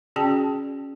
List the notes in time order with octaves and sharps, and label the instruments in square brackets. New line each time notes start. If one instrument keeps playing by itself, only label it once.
[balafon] C#4 F#4 G#4 D5 G5 A5